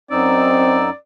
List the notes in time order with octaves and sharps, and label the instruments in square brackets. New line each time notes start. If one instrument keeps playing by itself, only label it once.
[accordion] F#2 D#4 E6 [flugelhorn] C4 [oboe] D5